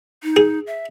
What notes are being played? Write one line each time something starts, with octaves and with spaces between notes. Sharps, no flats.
D#4
G#4
E5